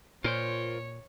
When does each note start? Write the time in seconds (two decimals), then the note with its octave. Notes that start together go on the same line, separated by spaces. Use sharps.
0.24 A#2 F4 A#4 C5 C#5